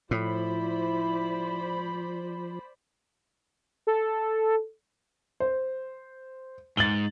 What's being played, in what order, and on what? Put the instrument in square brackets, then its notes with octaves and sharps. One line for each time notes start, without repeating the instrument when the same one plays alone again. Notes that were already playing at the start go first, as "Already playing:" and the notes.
[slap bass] A2 [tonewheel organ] F3 [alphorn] E4 [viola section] C5 D5 B5
[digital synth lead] A4
[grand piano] C5
[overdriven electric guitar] G#2 [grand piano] A6 F#7 G7